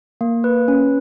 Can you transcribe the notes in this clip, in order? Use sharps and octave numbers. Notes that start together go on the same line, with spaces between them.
A#3
B4
C#4